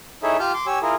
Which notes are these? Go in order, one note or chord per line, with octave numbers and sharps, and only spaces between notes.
D#4 E4 G#4 A4 C#5 E5
F4 G4 A5 F6 G6
C6 D6
G4 C#5 G#5 E6
E4 F4 G#4 A#4